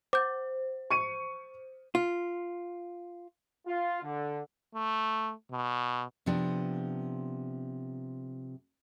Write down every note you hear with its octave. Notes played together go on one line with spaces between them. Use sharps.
C5 D6 G6
C#6 C#7 D#7
F4
F4
D3
A3
B2
C3 F3 B3 D4